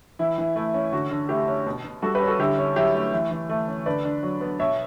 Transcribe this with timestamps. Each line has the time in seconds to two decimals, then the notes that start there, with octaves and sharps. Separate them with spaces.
0.19 E3 E4
0.38 E3
0.56 A3 E4
0.74 C#4
0.92 D3 F#4
1.11 D3
1.29 A3 E4 G4
1.48 C#4
1.66 B2
1.85 B2
2.02 G3 F#4 A4
2.15 G4 B4
2.21 C#4
2.27 F#4 A4
2.39 D3 E4 G4
2.58 C#4
2.76 F#3 E4 G4
2.94 A3
3.13 E3
3.31 E3
3.49 A3
3.68 C#4
3.86 D3 B4 D5
4.05 D4
4.23 F#3
4.41 B3
4.60 B2 C#5 E5